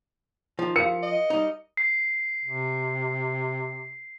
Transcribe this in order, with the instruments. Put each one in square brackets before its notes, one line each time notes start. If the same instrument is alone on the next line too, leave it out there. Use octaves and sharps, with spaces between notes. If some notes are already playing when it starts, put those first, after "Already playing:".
[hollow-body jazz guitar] D#3 F3
[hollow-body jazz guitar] F3 [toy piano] A#4 F5 [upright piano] C#7
[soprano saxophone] D#5
[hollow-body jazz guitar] G3 D#4
[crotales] C7
[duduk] C3